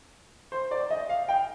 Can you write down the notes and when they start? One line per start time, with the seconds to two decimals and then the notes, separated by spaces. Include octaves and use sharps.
0.52 C5
0.71 D5
0.90 D#5
1.09 F5
1.29 G5